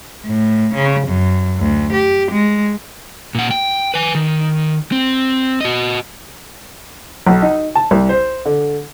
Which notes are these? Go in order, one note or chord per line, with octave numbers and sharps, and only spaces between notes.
A2
C#3
F#2
D2
G4
G#3
A#2 F#5
G5
B4 G#5
D#3
C4
F#4 D#5
B1
D#4
A5
C2
C5
D3